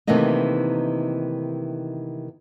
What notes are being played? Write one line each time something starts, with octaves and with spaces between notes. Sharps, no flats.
C3 D#3 E3 A3 A#3 D#4